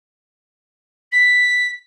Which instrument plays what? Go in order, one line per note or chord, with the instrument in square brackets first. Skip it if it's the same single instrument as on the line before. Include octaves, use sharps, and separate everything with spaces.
[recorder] B6